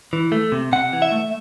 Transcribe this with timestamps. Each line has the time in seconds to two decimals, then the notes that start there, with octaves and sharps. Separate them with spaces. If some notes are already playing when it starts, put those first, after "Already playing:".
0.13 E3
0.32 A3
0.52 C3
0.72 C3 F#5
0.93 E3
1.02 E5
1.12 A3